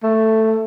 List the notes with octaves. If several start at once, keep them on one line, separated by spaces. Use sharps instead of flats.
A3